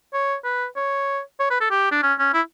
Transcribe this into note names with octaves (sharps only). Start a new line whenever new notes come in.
C#5
B4
C#5
C#5
B4
A4
G4
D4
C#4
C#4
E4